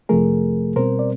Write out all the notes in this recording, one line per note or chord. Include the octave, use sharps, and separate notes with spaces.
F2 C3 F3 A3 G#4 A#4
B2 G3 C4 A#4 C5
D5